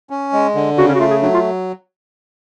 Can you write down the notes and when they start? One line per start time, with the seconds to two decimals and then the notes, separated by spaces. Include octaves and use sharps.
0.10 C#4
0.33 G#3
0.55 D3
0.77 C#3 F#4
0.88 C#4
0.95 F#4
1.00 A3 F4
1.10 G#4
1.22 F#3 D4
1.34 F4